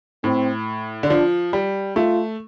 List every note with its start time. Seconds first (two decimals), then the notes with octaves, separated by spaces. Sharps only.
0.24 A2 C4
1.03 D3
1.10 F3 D4
1.53 G3
1.96 A3 F4